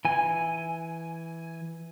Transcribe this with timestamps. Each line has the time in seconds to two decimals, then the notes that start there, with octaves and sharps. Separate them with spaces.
0.05 E3 G#5